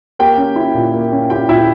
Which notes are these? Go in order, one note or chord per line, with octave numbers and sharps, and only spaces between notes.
A#3 G4 G5
C#4
E4
A#2
A#3
C#4
E4 G4 G5
A#2 E4 E5